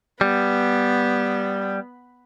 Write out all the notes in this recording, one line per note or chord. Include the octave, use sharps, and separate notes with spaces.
G3 B3